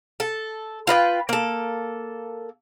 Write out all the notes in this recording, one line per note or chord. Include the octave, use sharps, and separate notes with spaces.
A4
F4 B4 D#5 G5
A#3 A4